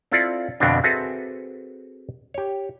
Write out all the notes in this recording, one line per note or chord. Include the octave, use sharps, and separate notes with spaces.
C4 E4 F4 A4 D5
F2 B2 D3 B3 C4 D4
C4 F#4 G#4 A4 B4 E5
G4 C#5